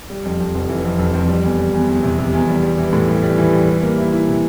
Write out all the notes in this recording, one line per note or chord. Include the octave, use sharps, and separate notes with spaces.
G3
F2
F2
F1
E3
F2
F2
F2
G3
E2
G3
E2
E2
C3
C3
E2
G3
G3
E3
A2
G3
G3
E3
G3
G3
A#3
E4
E4
C3